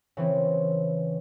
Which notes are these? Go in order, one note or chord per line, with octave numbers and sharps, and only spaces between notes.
C#3 E3 C4